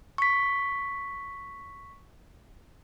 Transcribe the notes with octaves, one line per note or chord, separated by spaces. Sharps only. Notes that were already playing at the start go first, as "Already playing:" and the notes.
C#6 B6